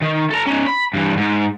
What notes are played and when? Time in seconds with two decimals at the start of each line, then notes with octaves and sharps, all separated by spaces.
0.02 D#3
0.31 A4 A#5
0.47 C#4 D#4
0.67 B5
0.94 G2 E3
1.17 G#2